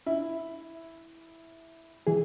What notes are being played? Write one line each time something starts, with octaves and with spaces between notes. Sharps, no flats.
E4
E3 G#4